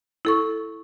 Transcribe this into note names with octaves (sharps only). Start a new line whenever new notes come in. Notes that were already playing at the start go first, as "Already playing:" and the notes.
E4 A4 C#6